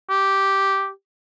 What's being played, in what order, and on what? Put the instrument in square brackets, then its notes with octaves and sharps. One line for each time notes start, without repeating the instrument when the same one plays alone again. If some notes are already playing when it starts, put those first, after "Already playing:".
[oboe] G4